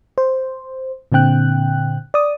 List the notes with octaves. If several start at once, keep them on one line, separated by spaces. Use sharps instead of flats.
C5
A#2 D3 C4 G5 F#6
D5 D#6